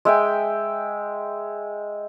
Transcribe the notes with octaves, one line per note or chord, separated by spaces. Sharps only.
G#3 E5 G5 G#5